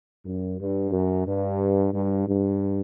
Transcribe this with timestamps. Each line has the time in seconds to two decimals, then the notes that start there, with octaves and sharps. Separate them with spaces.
0.25 F#2
0.59 G2
0.91 F#2
1.26 G2
1.93 G2
2.27 G2